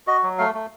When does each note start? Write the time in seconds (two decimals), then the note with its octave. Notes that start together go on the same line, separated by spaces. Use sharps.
0.07 F#4 D#5
0.23 F#3
0.39 A3 F5
0.55 A3